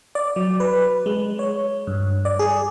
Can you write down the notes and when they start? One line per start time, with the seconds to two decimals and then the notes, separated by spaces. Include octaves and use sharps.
0.15 D5
0.36 F#3
0.60 B4
1.06 G#3
1.39 C#5
1.87 G2
2.25 D5
2.39 G#4